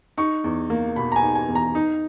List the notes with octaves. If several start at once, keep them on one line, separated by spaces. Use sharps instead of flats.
D#4 C#6
E2
A#3
B2 B5
A#5
G#5
D#4
G#5
E2
A#5
D#4